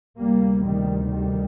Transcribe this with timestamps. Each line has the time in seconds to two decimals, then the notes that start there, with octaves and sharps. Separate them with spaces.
0.19 D2 C3 G3 A#3
0.65 D#3 G3
1.12 D#3 G3